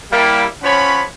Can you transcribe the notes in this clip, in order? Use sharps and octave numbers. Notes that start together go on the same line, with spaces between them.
G3 A#3 E4
F3 C#4 C#5 F#5 B5